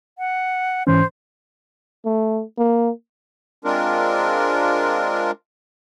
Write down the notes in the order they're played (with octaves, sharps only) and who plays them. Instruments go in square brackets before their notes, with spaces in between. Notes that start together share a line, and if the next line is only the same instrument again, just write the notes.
[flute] F#5
[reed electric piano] G#2 E3 C#4 [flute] C5
[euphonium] A3
A#3
[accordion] G#3 C4 D4 F4 A#4